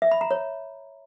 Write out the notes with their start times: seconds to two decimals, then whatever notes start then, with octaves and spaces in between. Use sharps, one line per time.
0.02 E5
0.11 B5
0.21 A#5
0.31 C#5